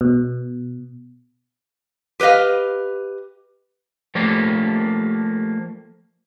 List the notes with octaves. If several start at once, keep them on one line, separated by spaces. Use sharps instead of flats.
B2
G4 B4 C5 D#5 F5
F3 A3 A#3 G4 C#5 D5